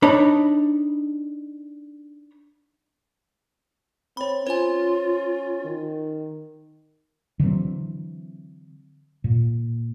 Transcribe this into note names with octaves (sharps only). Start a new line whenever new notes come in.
D4 D#4 C#5 B5
C4 C#5 B5
C#4 F4 C5 G#5
D#3
D3 E3 F#3 C4
A#2